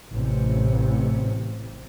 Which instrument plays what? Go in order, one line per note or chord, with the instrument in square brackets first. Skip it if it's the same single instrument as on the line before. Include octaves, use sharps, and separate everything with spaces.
[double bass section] A1 C3